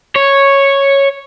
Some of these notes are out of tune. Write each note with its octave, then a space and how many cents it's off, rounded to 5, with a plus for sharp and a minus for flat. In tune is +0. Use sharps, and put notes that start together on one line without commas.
C#5 -5